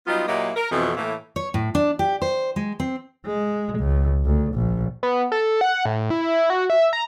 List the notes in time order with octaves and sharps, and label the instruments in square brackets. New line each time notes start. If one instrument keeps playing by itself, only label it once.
[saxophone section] F#3 G3 B3 D#4 F4
A#2 F#3 A#3 E4 G4 D#5
A#4
F2 B2 E3
A2 E3 A#3
[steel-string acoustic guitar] C#5
A2
D4
G4
C5
G#3
C4
[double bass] G#3
C#2
D2
A#1
[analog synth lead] B3
A4
F#5
A2
E4
F#4
E5
A#5